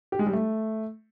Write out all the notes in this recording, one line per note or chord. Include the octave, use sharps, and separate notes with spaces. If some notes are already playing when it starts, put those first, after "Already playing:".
G4
G#3
G3
A3